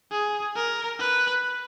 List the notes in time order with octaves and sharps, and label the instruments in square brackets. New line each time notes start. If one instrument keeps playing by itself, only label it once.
[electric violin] G#4
A#4
B4